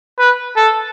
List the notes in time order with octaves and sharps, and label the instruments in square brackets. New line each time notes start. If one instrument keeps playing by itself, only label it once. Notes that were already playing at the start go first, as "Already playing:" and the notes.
[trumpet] B4
A4